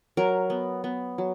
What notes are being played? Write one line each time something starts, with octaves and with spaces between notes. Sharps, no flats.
F#3 A#4
B3
B3
F#3